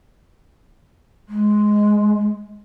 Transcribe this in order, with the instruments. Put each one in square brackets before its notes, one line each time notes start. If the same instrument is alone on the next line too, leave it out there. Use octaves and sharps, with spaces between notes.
[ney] G#3